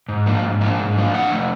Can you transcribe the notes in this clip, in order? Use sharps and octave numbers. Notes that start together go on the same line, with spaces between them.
G#2
F3 A#3 D4
G#2
F3 A#3 D4
G#2
F3 A#3 D4
A2 F#5
F3 A3